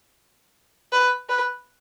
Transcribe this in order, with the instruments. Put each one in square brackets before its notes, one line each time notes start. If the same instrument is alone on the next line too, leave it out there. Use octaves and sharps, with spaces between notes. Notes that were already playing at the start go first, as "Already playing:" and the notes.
[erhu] B4
B4